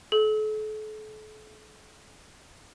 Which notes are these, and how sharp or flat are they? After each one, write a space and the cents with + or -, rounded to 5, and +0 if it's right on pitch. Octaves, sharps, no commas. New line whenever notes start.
A4 -40